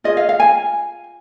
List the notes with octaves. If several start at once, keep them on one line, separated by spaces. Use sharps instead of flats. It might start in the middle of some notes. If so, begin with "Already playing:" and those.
F4 G#4 D#5
F5
F5
G#5